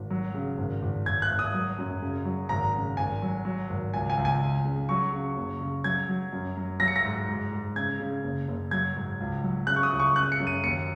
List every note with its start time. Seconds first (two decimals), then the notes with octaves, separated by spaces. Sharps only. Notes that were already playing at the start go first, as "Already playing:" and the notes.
Already playing: G#1
0.10 F#3
0.34 C#3
0.58 G#1
0.82 G#1
1.06 G#1 G#6
1.22 F#6
1.30 G#1
1.39 D#6
1.54 F#3
1.78 F#2
2.02 C#3
2.25 F#3
2.49 G#1 A#5
2.74 C#3
2.97 G#1 G#5
3.22 F#3
3.45 F#3
3.70 G#1
3.94 C#2 G#5
4.10 G#5
4.17 C#2
4.25 G#5
4.42 C#2
4.65 C#3
4.89 F#3 C#6
5.12 C#3
5.37 F#1
5.60 C#3
5.84 F#3 G#6
6.09 F#3
6.32 F#2
6.57 F#3
6.80 F#3 A#6
6.88 C#7
6.96 A#6
7.05 G#2
7.28 G#2
7.52 G#2
7.76 C#3 G#6
7.99 C#3
8.23 F#1
8.48 F#1
8.71 F#3 G#6
8.96 G#2
9.20 C#2
9.44 F#3
9.67 C#3 F#6
9.76 C#6
9.83 D#6
9.92 C#2
10.00 C#6
10.15 C#3 F#6
10.32 C#7
10.40 F#2
10.47 D#7
10.63 D#2 C#7